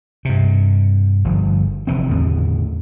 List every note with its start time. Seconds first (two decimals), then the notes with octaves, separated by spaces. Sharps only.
0.25 G2 C3
1.24 G1 F3
1.87 F1 E3 C4
2.09 E2 A2 D3